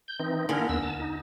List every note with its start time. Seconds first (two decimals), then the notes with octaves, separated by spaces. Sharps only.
0.08 G6
0.20 E3 C4 D#4
0.49 D3 A#3 E4 G#4 A#4
0.69 D#2 B3 E6
0.83 A5
1.00 D#4